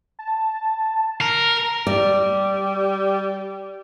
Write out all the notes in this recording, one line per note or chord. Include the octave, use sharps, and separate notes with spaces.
A5
A#4
G3 D5